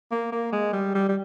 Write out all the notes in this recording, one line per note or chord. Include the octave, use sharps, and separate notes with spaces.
A#3
A#3
G#3
G3
G3
G3